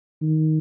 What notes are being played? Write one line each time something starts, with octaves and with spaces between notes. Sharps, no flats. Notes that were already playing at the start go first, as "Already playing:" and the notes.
D#3